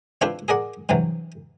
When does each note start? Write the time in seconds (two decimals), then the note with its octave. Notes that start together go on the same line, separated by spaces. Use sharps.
0.21 C4 D4 E4 F4 B4 C5
0.48 G#4 A#4 D5 F#5
0.89 G2 C3 E3 F#3